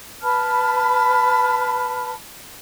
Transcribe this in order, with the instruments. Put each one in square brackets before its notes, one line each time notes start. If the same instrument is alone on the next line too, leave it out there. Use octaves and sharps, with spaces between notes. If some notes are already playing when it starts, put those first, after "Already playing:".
[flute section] B4 A5 B5 F6